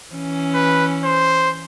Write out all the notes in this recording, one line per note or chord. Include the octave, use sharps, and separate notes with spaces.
E3 C#4
B4
C5